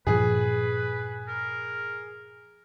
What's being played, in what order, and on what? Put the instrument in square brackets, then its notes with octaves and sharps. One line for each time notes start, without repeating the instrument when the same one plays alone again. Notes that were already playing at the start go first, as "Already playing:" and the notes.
[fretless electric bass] G2 A#2 F3 [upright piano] G#4 [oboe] B4
[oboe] A#4